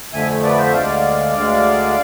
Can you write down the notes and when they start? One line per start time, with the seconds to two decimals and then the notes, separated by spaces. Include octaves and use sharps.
0.13 F2 D3 F3 A3 E5 G#5
0.43 B4 D5
0.58 C5 E5
0.73 D2 D3 G#3 D5 F5
1.34 D2 D3 G#3